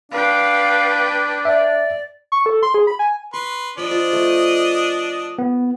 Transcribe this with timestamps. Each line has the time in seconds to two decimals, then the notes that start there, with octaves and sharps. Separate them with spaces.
0.12 D4 B4 F5 G5
1.45 D5 E5
2.32 C#6
2.46 A4
2.63 C6
2.74 G#4
2.87 B5
2.99 G#5
3.34 B4 C6 C#6
3.78 F3 D4 D#5 B5 C#6
3.91 F4 C5 D5
4.13 A3
5.38 B3